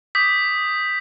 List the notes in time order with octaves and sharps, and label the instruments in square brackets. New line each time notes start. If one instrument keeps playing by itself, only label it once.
[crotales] D6 D#6 G6 B6